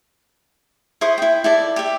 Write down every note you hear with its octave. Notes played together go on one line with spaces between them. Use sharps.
E4 C5 C#6 D#6
E4 G5
E4 A4 D5
G4 E5